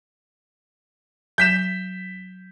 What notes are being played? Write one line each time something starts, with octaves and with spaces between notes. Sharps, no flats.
F#3 G6 B6 E7